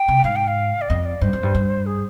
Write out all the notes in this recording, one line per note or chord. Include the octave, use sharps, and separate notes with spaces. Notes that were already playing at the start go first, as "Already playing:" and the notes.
Already playing: G5
C3
A#2
G#2 F5
G5
F5
D5
F2 D#5
D5
G2 C5
F2
G2
G2
G#4